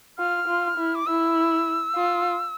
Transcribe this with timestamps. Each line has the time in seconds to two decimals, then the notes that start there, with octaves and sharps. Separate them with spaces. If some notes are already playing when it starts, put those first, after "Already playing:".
0.18 F4 F6
0.47 F4
0.77 E4
0.95 D6
1.07 E4 E6
1.95 F4